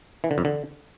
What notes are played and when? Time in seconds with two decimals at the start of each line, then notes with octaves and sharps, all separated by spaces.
0.24 E3
0.31 D3
0.38 F2
0.45 D3